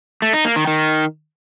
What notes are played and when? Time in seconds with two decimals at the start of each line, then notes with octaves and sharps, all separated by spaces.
0.22 A3
0.33 D#4
0.45 A#3
0.56 D#3
0.67 D#3